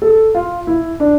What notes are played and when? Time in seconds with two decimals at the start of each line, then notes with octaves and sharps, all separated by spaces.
0.02 A4
0.35 F4
0.67 E4
1.00 D4